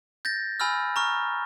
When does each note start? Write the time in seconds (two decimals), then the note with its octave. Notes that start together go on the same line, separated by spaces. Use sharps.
0.25 G6 A6 A#6
0.60 G#5 B5 E6 F6
0.96 A#5 C#6 F6